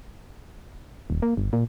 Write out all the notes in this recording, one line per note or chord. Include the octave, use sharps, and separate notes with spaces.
D#1
A#3
G1
A#2